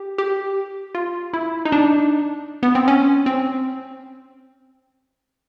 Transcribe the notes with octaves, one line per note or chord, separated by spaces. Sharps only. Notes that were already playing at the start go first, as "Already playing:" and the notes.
Already playing: G4
G4
F4
E4
D#4
D4
B3
C4
C#4
C4